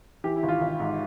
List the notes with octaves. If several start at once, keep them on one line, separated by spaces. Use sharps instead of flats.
E3 G4
E4
G#1
F4
G#1
G#2